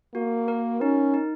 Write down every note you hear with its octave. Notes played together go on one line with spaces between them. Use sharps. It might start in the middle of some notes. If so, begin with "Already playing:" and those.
A#3 F#4
A#4
C#4 D#4
D#4